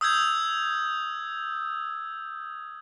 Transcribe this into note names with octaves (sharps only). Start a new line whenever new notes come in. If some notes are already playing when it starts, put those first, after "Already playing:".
D#6 E6 G6 G#6